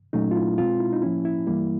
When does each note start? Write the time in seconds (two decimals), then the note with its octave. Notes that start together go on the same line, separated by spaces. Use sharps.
0.13 A#2 F#3 A3 C#4 D#4
0.31 F4
0.36 E4
0.58 B2 G#3 C4 F4
0.80 E4
0.93 D#4
1.02 A2 F3 A#3 C#4 E4
1.25 E4
1.47 G2 E3 G3 A#3 E4